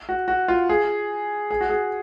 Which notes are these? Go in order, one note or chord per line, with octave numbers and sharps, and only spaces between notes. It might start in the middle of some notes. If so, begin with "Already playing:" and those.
F#4
F#4
F4
G#4
G#4
F#4
G#4